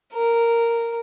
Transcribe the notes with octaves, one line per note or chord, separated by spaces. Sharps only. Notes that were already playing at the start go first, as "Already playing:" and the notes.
A#4